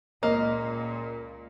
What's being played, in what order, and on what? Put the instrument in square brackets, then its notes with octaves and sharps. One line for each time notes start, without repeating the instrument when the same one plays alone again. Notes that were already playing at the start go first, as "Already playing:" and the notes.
[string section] C#2 A#2 [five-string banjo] A#3 [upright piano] D#5